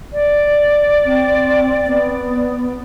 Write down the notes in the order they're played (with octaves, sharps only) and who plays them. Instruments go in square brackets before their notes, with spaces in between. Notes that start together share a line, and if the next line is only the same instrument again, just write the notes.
[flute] D5
[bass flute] C4
B3